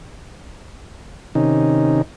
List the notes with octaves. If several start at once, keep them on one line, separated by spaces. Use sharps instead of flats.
C3 D#3 C#4 D#4